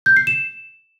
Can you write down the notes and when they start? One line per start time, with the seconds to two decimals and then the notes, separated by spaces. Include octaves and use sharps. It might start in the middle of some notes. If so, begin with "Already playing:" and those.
0.06 G6
0.17 C7
0.27 E7